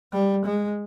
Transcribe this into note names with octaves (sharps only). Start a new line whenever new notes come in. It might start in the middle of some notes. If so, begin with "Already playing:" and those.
G3
G#3